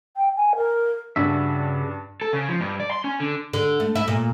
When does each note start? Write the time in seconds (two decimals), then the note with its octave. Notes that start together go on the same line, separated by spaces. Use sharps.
0.17 G5
0.37 G#5
0.56 A#4
1.16 G2 C#3 D4 F#4 E5
2.22 A4
2.33 C#3
2.49 F3
2.61 G2
2.80 D5
2.91 C6
3.04 C#4
3.20 D3
3.53 D3
3.80 A3
3.95 E4
4.08 A#2